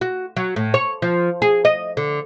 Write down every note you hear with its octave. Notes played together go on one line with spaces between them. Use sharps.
F#4
F#3
A2
C#5
F3
G#4
D#5
D3